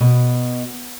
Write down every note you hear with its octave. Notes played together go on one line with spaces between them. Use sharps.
B2